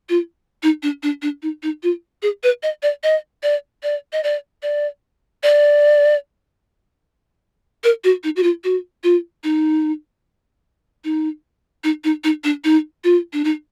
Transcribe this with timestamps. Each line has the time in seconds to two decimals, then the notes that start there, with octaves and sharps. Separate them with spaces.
0.09 F4
0.63 D#4
0.83 D4
1.03 D4
1.22 D4
1.43 D#4
1.63 D#4
1.83 F4
2.22 G#4
2.43 B4
2.63 D#5
2.83 D5
3.03 D#5
3.43 D5
3.83 D5
4.13 D#5
4.24 D5
4.63 D5
5.43 D5
7.84 A#4
8.04 F#4
8.24 D#4
8.36 F#4
8.43 F4
8.64 F#4
9.04 F4
9.44 D#4
11.04 D#4
11.84 D#4
12.04 D#4
12.24 D#4
12.44 D4
12.64 D#4
13.04 F4
13.33 D4
13.44 D#4